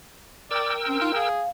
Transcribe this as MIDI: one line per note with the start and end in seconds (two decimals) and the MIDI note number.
0.51 1.29 70
0.51 0.74 74
0.51 1.29 79
0.51 1.29 88
0.87 1.01 60
0.87 1.01 61
1.01 1.12 63
1.01 1.10 65
1.15 1.43 68
1.15 1.49 77